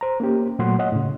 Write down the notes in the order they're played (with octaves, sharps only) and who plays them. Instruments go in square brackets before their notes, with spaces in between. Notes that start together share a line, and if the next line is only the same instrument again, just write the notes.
[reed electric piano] C5 A#5
A#3 C#4 G4
A#2 F#3 A3 F#5 C6
C#5 D#5 F#5
A2 C#3